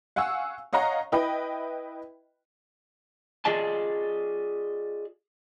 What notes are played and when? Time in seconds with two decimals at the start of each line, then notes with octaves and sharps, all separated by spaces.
0.16 F5 F#5 G#5 C#6 E6
0.73 C#5 D#5 F5 F#5 A#5
1.12 E4 B4 D#5 G5 B5
3.45 F4 G#4 D5 D#5 A5